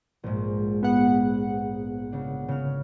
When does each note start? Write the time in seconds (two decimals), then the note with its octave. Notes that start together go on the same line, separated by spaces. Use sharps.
0.24 A#1 G#2
0.83 B3 F#5
2.12 C#3 D4
2.48 C#3 F6